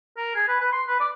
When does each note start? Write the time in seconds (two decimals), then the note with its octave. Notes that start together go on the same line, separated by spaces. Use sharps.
0.17 A#4
0.35 G#4
0.48 B4
0.61 B4
0.72 C6
0.87 B4
1.00 D5